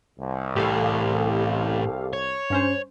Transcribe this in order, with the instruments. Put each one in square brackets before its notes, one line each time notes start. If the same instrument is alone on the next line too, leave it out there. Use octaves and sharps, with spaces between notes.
[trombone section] C2
[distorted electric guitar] A2 E3 [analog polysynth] G4 A4 F5
[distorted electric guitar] C#5
[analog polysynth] G2 C#4 C5